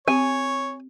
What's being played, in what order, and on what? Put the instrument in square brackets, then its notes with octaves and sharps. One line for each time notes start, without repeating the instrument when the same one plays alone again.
[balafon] C4 G4 [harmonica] C#5 [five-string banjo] G#5